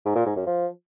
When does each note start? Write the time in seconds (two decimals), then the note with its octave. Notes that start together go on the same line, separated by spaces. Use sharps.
0.05 G#2
0.15 A#2
0.26 G#2
0.36 F#2
0.46 F3